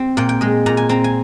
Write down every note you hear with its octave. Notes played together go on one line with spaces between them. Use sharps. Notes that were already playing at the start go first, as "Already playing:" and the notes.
Already playing: C4
A#2 G5
G5
G#3 D#5
A#2 A#5
G#5
C4 A#5
G#5